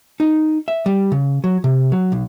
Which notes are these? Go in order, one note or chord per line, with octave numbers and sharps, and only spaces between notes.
D#4
E5
G3
C#3
F#3
C3
F#3
B1